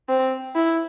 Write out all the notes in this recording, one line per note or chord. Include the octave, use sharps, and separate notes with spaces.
C4
E4